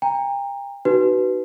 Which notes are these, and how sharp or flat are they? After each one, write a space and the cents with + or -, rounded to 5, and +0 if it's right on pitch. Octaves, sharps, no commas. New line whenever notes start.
G5 +40 A#5 +0
D#4 +0 F#4 +35 B4 +0